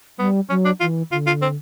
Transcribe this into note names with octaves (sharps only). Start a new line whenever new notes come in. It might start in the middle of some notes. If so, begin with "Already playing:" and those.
G3 B3
F#3 C#4
D4
E3 F4
D3 F4
F4
C4